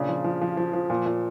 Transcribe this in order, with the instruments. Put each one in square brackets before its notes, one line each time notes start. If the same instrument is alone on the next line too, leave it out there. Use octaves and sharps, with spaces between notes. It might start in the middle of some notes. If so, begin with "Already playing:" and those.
Already playing: [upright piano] A#2 C#3 D4
F3
F3
F3
F3
F3
A#2
A#2